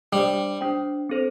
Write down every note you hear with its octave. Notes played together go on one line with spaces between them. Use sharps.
G3 D4 C5 G5
D4 C5 G5
C4 A4 C5